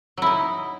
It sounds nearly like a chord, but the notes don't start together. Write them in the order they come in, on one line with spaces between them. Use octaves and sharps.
F#3 E4 D#4